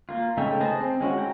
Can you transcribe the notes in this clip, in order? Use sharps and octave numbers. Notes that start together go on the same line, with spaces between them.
A#3 F4
C#3 A3 D#4 E5 G5
G#4 B4 C5 D#5 A5
C4
G#3 C#4 E4 F#4
G5 A#5